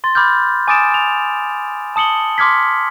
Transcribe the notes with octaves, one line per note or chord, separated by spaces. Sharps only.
C6 A6
B5 D6 F6 G6
G#5 D6 D#6 A6 D7 E7
F7
A5 D#6 C#7 F#7 G7
C6 D6 F6 G#6 B6